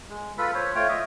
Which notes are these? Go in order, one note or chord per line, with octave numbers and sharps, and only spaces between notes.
G#3
F4 A4 B4 B5
C5 C#5
A3 F4 C#5 G5
D#5 E5